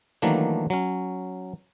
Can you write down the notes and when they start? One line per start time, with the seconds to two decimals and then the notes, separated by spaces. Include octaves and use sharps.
0.22 D#3 E3 F#3 A3 A#3 D4
0.70 F#3 C#4